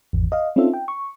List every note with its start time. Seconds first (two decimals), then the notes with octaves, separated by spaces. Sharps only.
0.13 G#1 E2
0.32 D#5 F5
0.56 C4 C#4 D#4 F4 A4 E5
0.74 G5
0.88 C#6